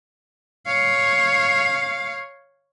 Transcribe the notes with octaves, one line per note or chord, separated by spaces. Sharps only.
C#5 F5